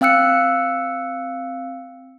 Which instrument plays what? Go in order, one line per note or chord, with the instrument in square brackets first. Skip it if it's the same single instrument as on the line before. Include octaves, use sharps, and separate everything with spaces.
[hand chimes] C4 F5 G5 E6 F#6 C#7